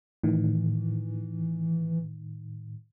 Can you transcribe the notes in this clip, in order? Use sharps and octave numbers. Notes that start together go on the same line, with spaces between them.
A2 D#3 E3